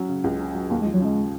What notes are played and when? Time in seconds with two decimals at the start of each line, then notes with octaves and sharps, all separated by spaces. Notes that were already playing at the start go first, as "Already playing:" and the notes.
Already playing: F#3 C#4
0.09 C#3
0.24 C#2
0.40 C#4
0.55 F#3
0.70 D#2 A#3
0.81 G#3
0.85 F3
0.94 F#3
1.01 C#3 G#3